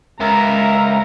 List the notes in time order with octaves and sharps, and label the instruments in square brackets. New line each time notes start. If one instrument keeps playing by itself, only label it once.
[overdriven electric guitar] C#2 [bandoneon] A#4 E5 [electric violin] A#5